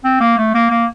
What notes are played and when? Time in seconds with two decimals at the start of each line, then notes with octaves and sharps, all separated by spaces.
0.04 C4
0.21 A#3
0.38 A3
0.54 A#3
0.70 A#3